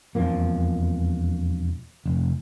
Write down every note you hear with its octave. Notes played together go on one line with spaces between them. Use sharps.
E1 F2 F3 A#3
F1